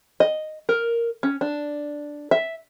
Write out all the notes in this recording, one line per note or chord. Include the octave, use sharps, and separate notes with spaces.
D#5
A#4
C#4
D4
E5